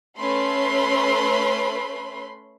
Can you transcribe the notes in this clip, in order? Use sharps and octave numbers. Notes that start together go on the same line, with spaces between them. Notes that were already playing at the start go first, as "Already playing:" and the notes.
A3 C#4 B4 B5 C6